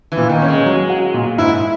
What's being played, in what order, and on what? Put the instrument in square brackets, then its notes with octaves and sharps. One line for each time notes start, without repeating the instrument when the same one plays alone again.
[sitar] E3
[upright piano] A#2
[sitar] D#3
[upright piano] C#4
[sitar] G#3
[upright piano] F#3
F#4
A#2
[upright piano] G#2 [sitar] E4